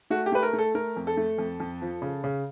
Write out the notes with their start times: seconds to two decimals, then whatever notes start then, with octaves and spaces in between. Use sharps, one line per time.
0.10 A3 F#4
0.26 G4
0.32 A3 B4
0.43 A#4
0.53 A3
0.59 A4
0.75 A3 A#4
0.96 F2
1.07 A4
1.17 A3
1.38 F2
1.60 F2
1.82 F3
2.02 C#3
2.24 C#3